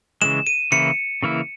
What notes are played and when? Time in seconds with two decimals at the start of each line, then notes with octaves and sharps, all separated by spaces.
0.22 C#3 E3 G#3 E7
0.47 D#7
0.72 C#3 E3 A#3 E4 C#7
1.23 C#3 E3 A#3 E4